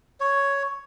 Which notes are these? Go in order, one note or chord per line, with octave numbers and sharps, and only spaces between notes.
C#5